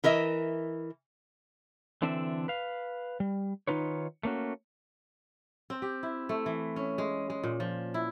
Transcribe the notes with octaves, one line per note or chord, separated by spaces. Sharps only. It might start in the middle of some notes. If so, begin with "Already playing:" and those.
E3 A#4 D#5 E5
D3 E3 C4 D4 A4 E5
B4 F5
G3
D#3 F#3 D#4 F4 B4 C#5
A3 A#3 C#4 F#4
C4
G4
E4
A3
E3
C#4
G#3
G#3
A#2
F3
E4